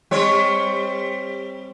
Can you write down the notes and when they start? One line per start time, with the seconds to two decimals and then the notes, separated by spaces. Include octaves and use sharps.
0.11 G3 C4 C#5